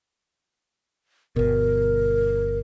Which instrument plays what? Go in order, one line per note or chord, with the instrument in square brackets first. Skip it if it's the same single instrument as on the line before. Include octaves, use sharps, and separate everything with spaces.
[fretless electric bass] G1 B2 [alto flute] A#4